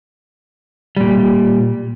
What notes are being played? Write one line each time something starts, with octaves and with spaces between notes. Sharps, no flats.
A#2 G3